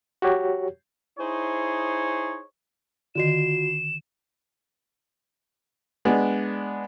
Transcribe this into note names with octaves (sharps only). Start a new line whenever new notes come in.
F#4 G4 C#5
D#4 E4 G#4 C5 C#5
D3 D#3 F4 F#4 C7 E7
G#3 B3 D4